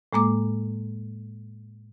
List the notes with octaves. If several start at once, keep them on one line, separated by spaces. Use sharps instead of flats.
A2 G#3 A#3 D6